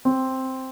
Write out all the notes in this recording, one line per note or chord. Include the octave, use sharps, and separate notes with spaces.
C4